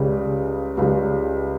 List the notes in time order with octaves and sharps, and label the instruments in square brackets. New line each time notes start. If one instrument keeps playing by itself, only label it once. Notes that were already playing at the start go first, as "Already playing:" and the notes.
Already playing: [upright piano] C#2 C#3 G3
C#2 C#3 G3